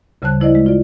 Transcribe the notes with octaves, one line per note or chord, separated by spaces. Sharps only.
D2 C#3 G3 C5 A5 F#6
F3 E4 C5 D5 D#5
G#3
F4 D5